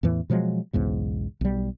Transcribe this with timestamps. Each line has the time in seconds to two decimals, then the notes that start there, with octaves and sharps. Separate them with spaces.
0.03 E2 A2 E3
0.30 B2 F3 F#3 G#3
0.73 B1 E2 G#2 C#3
1.41 B1 G3